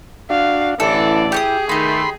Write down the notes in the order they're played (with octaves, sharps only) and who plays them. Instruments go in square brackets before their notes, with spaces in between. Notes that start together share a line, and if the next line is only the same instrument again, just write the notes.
[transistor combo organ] D4 F#4 [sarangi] F5
[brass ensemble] A1 D3 D5 [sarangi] E3 [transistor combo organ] E4 [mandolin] A4
[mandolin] G4 C#6 D#6 [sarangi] G#4
[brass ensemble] D#3 A3 [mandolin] D#4 G4 [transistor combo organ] B5 C6